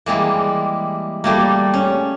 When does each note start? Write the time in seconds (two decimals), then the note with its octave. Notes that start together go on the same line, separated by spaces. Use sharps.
0.06 E3 G3 G#3 A#3
1.24 G3 A3 A#3
1.74 C#4